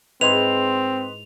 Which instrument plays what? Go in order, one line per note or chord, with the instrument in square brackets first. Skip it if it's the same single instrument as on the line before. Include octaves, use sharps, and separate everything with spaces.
[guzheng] G#2 E4 [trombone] C4 [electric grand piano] B4 D#5 C6 [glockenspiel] F7